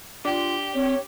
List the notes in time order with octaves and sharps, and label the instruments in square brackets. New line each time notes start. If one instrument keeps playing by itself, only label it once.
[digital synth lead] D4 [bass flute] F4 [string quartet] G4
[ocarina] C4 [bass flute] C#5